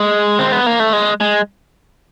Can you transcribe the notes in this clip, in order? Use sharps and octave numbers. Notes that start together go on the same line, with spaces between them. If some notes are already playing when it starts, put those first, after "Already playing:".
Already playing: G#3
C4
B3
A#3
A3
G#3
G#3